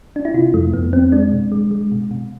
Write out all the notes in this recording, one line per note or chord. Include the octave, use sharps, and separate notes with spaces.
D4
E4
C3 F4
F2 A3
F2 B3
F2 C4
G#3 D4
B2
G#3
G#3
B2
B2